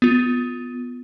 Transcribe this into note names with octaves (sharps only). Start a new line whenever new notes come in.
B3 F4